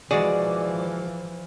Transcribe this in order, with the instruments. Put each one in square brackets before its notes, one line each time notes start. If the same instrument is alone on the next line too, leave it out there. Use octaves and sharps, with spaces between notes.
[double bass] E3 F3 [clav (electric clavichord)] G#3 F#4 G#4 [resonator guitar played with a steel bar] D5